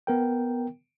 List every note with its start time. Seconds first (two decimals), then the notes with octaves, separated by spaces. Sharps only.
0.07 B3 A#4 G5